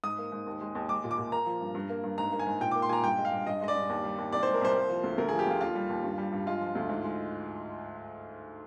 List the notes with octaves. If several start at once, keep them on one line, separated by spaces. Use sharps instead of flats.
G#2 D#6
A#3
G#2
D#2
G#3
D#2
G#3 D6
A#2
D6
A#2
A#3 A#5
F3
G2
G2
A#3
G2
G#2 A#5
A#3
G#5
G#2
A#2 G5
A#3 D6
C6
A#2 G#5 A#5
G2 G5
G#3
F5
G2
G2 D#5
G#3 D#5
D5
G2
D#2
G3
D#2
C2 D5
G#3 C5
A#4
C2 C5
A#3
F3
D2
D2 A#4
F3 G#4
G4
D2 F4
D#2 F4
G3
D#2
G2
G3
G2
G#3 F4
F3
D2
G#2
G#3